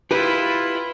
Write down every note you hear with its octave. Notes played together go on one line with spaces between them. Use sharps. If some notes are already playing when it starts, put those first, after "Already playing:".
E4 F4 G4 B4